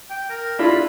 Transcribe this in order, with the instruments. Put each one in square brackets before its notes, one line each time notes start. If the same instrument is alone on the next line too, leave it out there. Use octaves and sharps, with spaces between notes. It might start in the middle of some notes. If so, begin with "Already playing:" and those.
[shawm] G5
A#4
[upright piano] D4 E4 F4 [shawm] B5